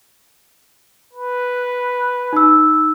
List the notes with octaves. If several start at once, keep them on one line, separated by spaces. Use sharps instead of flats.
B4
D#4 E6